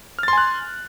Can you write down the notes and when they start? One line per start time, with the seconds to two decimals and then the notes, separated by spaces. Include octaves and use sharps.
0.19 F6
0.23 A6
0.28 C6
0.33 G#5
0.38 F#6